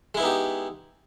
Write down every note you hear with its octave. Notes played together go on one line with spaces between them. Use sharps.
G#3 B3 D#4 E4 G4